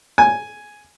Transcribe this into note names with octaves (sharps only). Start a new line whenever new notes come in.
G#5